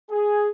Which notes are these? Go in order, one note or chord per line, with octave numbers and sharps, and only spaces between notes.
G#4